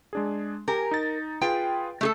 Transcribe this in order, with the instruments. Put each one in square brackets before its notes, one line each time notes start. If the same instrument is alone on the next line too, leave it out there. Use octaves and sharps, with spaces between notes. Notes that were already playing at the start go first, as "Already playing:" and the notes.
[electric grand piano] G#3 D4 G#4
[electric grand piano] G4 G#5 A#5 [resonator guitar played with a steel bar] A#4
[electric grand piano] D#4 A6
[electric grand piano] F4 G#4 B4 [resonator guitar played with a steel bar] G5
[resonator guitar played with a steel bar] A3 G#4 A4